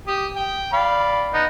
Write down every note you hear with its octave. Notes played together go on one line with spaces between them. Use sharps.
G4 D#6
G5
D5 F5 B5
B3 D#4